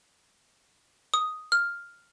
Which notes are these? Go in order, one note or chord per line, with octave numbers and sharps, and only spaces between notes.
D#6
F6